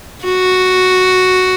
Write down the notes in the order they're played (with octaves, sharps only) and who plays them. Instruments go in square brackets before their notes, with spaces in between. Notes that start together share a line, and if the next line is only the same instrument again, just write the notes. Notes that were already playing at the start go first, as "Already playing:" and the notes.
[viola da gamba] F#4